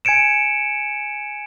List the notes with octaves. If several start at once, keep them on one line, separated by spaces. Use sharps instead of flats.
G#5 G#6 C#7 D7 E7